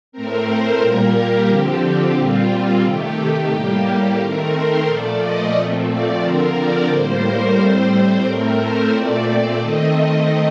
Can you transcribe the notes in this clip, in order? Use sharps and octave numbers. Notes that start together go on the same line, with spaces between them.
A2 A3 C4 A#4
C5
A#2 G3 A#3 A#4
G4
D3 F3 C4
A#2 G3 C4 F4
C3 D#3 A3 G4
A2 G3 A#3 G4
D#3 A3 C4 A#4
C5
A#2 F3 A3 D5
D#5
A#2 F3 A3 C4
D5
D3 F3 C4 A#4
D5
A2 G3 A#3 C5
A#4
A2 G3 C4 C5
A2 A3 C4 A#4
C5
A#2 A3 C4 D5
D#3 A3 C4 D#5
D#5